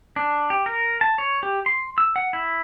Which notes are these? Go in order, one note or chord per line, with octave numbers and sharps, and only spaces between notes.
D4
G4
A#4
A5
C#5
G4
C6
E6
F#5
E4